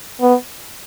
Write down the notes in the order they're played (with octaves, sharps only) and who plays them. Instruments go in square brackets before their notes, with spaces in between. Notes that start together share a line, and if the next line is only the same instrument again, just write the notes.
[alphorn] B3